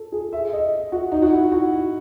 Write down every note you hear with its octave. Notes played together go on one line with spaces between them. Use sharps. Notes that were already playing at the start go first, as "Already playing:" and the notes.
Already playing: A4
G#4
E5
D#5
F#4
D#4
F#4
E4
F#4